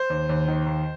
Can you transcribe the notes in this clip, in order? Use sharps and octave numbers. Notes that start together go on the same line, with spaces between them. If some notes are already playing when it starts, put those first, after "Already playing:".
Already playing: C5
D#2
D#2
D#3
D#2